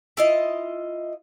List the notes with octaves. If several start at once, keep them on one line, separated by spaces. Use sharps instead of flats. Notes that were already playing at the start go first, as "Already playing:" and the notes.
E4 F4 D#5